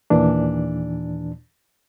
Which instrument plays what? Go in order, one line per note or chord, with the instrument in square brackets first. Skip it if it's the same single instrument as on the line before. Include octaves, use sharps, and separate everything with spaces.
[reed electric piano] D#2 A#2 E3 D4